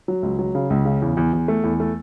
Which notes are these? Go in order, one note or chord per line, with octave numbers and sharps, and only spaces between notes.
F#3
C#2
F#3
C#3
C#2
C#3
E2
E2
E2
A3
E2
A3